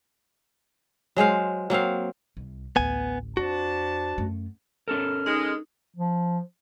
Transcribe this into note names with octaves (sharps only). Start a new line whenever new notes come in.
F#3 G#3 C5 F5
F#3 A#3 C4 F5
C2
A1 D2 B3 G#5
F2 D4 F4 F#4 C5 A5
F#2 A3
C#4 A4 A#4 F6
G#3 D#4
F3